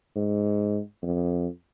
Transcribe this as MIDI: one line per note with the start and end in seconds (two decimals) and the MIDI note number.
0.16 0.80 44
1.02 1.47 41